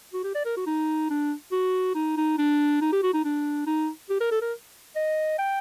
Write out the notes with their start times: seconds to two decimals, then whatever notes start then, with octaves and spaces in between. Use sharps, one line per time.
0.13 F#4
0.24 G4
0.35 D5
0.45 A#4
0.57 F#4
0.67 D#4
1.10 D4
1.52 F#4
1.95 D#4
2.17 D#4
2.38 D4
2.81 D#4
2.93 G4
3.03 F#4
3.14 D#4
3.25 D4
3.67 D#4
4.10 G4
4.21 A#4
4.32 A4
4.42 A#4
4.96 D#5
5.39 G5